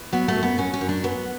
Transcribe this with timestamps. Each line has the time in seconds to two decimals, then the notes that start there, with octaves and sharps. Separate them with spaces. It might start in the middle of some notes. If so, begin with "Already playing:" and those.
Already playing: E2
0.12 F#3 B3
0.28 A3
0.35 F#2
0.43 B3
0.58 F#3 C#4
0.73 C#4
0.81 F#2
0.89 D4
1.03 F#3 B3